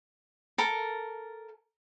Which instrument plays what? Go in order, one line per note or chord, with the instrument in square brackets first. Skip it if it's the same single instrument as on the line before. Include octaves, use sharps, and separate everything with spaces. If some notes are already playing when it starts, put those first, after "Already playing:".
[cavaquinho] A4 A#4